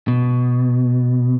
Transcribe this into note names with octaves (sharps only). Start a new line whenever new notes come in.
B2